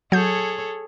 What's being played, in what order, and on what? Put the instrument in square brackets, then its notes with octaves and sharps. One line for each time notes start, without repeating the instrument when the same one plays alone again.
[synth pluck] F#3 G6 [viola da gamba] G#4 A4 C#5